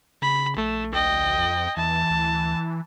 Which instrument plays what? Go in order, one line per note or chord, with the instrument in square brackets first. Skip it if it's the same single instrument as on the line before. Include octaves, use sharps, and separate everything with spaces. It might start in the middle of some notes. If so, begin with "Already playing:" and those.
[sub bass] C#3 [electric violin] B5
[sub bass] A#1 [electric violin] A3
[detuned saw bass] D2 [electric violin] D#5 G5
[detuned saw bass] F2
[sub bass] E2 [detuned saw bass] E3 [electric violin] A5
[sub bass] D2